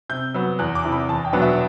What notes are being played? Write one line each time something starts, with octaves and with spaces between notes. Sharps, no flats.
C3 G6
F#3 B3
E2 F#6
D6
C3 E3
B5
E2 A5
G5
B2 F#3 B3 D4
E5